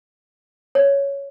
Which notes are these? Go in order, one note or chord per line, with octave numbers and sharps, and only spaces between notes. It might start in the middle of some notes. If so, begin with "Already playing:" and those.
C#5